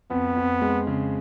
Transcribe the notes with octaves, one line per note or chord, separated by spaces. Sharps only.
F2 B3
F2
G#3
C#3